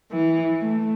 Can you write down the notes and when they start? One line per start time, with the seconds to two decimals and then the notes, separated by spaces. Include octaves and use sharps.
0.13 E3
0.61 A3